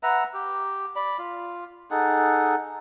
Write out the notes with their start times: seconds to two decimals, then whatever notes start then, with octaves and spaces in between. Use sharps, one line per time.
0.03 B4 E5 F#5 A#5
0.34 G4
0.96 D5 B5
1.19 F4
1.91 D#4 G#4 A4 F#5